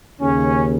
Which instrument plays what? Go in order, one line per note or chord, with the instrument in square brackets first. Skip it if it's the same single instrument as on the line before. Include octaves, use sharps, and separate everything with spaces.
[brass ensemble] D#2 C#3 C#4